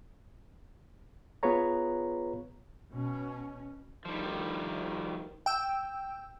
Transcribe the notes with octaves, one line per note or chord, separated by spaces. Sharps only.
B3 F4 G#4 B4 C#5 A#5
B2 C#4
D2 D#3 F3 G3
G5 E6